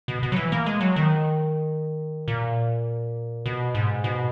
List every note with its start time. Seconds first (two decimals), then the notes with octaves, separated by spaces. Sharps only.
0.08 B2
0.23 B2
0.32 F#3
0.36 E3
0.52 A#3
0.66 G#3
0.81 F#3
0.96 D#3
2.28 A#2
3.46 B2
3.75 G#2
4.04 B2